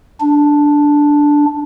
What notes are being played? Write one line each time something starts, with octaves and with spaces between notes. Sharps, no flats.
D4